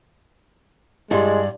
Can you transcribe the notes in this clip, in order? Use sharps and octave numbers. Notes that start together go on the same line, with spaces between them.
G2 G#3 E4 G4 D5 C6